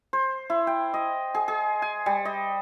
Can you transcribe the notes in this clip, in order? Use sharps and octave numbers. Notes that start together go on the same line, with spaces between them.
C5
E4
G5
D#5
G#4
G#4
G#5
G3
D#5